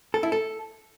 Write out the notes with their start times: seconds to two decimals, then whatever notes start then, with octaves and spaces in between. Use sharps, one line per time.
0.14 A4
0.23 E4
0.32 A4